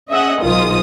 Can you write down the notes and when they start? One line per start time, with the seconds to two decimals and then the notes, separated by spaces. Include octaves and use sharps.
0.10 C#4 G#4 D#5 E5 F#5
0.44 B1 G#2 D#3 F#3 F4 D#6